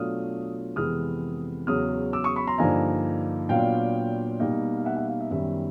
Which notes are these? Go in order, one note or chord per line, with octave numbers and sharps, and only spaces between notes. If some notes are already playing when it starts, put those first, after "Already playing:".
Already playing: B2 F#3 A3 D4 F4 D#6 F6
F2 C3 E3 G#3 B3 D#6 F6
E2 C#3 F#3 D#6 F6
D6 E6
C#6 D#6
B5 C#6
A#5 C6
G2 D3 F3 A#3 D#4 G#5 A#5
A#2 F#3 B3 D4 F4 F5 G5
B2 G3 A#3 D#4
F5
E5 F#5
E5 F#5
F5
E5
F#2 D#3 G3 B3 E5